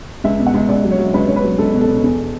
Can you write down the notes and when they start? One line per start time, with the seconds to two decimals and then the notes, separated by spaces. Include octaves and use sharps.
0.24 C#2 E5
0.39 B2
0.47 F#5
0.54 C#2
0.69 C#2 D5
0.84 F#3
0.91 C#5
0.98 F#3
1.14 C#2 B4
1.28 C#2 C#5
1.36 B4
1.44 F#3
1.58 C#2 A4
1.73 B2
1.81 A4
1.88 B2
2.03 E2